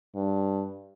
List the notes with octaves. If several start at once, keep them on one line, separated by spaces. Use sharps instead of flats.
G2